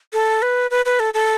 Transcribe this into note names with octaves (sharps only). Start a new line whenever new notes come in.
A4
B4
B4
B4
A4
A4